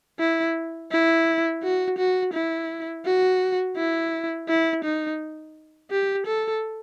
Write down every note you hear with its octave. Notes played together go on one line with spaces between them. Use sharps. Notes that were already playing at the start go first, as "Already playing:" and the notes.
E4
E4
F#4
F#4
E4
F#4
E4
E4
D#4
G4
A4